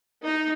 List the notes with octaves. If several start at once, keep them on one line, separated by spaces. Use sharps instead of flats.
D#4